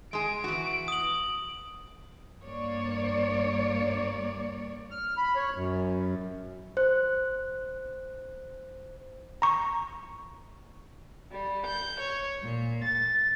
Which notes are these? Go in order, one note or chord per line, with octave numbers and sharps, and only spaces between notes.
G#3 G#4 D7
E3 F#4
D#6 F#7
G2 A#3 C#5 D5
F6
B5
C#5
F#2
C5 F#6
A#5 C#6
G3
G6
C#5
A#2
A6